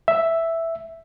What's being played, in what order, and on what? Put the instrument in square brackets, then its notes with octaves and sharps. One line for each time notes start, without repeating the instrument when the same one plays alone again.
[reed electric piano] E5